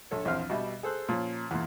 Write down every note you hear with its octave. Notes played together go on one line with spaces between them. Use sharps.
A#1 A4 C#5
A#1 E2 C4 F5 F6
B2 G3 E5
G#4 A4 C5 E6 F#6
A#2 F3 C#4
E2 A#2